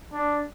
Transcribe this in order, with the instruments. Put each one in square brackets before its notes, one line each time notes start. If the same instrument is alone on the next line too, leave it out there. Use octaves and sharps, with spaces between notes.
[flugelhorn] D4